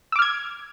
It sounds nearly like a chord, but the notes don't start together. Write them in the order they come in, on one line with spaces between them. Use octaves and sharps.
E6 D6 F6 G#6